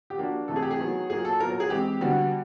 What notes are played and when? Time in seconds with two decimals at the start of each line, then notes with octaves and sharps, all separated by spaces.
0.10 G4
0.18 F3 A#3 D4 F#4
0.48 C3 E3 A3 A4
0.56 G#4
0.63 G4
0.71 G#4
0.79 D#3 F#3 B3
1.09 A#2 F#3 A#3 G#4
1.25 A4
1.40 A#2 F#3 B3 A#4
1.50 A#4
1.60 G#4
1.70 E3 G#3 C4 G4
2.01 D3 G3 B3 F#4